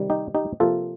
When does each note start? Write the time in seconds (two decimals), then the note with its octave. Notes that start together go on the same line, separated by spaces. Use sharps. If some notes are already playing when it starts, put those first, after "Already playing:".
Already playing: C3 D#3 G3
0.10 D#4 G4
0.35 D#4 G4
0.60 C3 F3 A#3 F4 A4